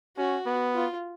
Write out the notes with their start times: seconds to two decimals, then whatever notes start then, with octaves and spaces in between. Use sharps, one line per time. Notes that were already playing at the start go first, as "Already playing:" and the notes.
0.17 C#4 F#4
0.46 B3
0.75 F4